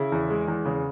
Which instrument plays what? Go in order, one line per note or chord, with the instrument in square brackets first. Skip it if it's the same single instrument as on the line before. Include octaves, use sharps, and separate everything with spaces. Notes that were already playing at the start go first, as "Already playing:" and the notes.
Already playing: [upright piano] C#3 E4
E2
G#3
E2
C#3